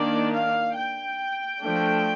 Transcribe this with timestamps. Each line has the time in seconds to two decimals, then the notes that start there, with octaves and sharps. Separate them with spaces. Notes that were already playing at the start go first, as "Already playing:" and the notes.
Already playing: D#3 A#3 D4 D5
0.34 F5
0.77 G5
1.61 F3 A3 D4